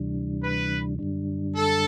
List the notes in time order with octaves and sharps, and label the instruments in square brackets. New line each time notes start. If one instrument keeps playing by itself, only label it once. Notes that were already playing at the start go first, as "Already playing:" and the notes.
Already playing: [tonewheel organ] D2 C3 E3 G3 D4
[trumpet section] B4
[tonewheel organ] F#2 D3 G3 D4
[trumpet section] A4